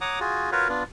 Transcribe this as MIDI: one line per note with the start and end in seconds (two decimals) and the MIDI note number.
0.01 0.20 73
0.01 0.20 78
0.01 0.20 82
0.01 0.20 86
0.01 0.20 87
0.20 0.50 65
0.20 0.50 66
0.20 0.50 68
0.52 0.68 65
0.52 0.68 66
0.52 0.68 70
0.52 0.68 71
0.52 0.68 73
0.52 0.68 77
0.69 0.83 59
0.69 0.83 62
0.69 0.83 65